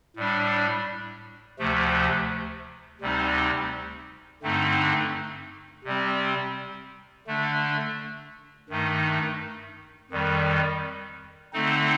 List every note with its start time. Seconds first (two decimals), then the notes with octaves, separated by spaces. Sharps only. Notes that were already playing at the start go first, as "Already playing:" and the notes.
0.17 A2 G3 D4
1.59 D2 C3 F3 A3
3.01 D2 C3 G3 C4 D#4
4.43 G2 D3 A3 C4 D#4
5.84 C3 G3 C4
7.27 D3 A3 D4
8.69 G2 D#3 A3 D#4
10.10 F2 D#3 G3
11.53 D3 A3 C4 D#4